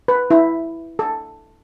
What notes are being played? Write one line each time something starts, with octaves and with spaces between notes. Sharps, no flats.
B4
E4
A4